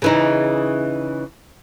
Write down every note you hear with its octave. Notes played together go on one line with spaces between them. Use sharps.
C#3 E3 D#4